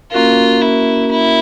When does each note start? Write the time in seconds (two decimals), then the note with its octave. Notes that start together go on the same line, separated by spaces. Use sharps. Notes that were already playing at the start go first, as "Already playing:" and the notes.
0.12 A#3 C#4 F4 F#4 A#4
0.62 E4
1.11 E4